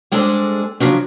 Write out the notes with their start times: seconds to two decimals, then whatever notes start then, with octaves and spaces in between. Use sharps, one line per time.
0.12 G3 G#3 D4 G#4 A4 C5
0.80 C#3 F3 F#3 D4